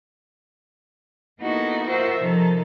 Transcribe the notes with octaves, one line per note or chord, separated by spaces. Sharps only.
A#3 B3 D#4 E4 F#4 A4
F4 F#4 A#4 C5 E5
C3 D#3 F3 A4